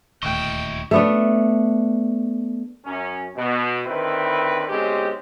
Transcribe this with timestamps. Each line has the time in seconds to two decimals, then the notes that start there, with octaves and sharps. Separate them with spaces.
0.23 D#1 D2 A2 E4 D#5 G5 C#6
0.91 A3 B3 D4
2.84 F#2 C#4
3.36 B2
3.86 D3 D#3 C4 E4 B4
4.69 B1 D3 G#3 C4 C#4 G4